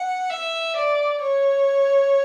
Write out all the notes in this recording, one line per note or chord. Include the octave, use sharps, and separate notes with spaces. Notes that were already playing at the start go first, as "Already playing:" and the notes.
Already playing: F#5
E5
D5
C#5